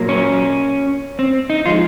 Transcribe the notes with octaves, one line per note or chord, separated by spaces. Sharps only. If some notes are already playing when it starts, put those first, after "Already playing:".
Already playing: A#2 F#3 A#3
C#4
C4
D#4
F3 G#3 F4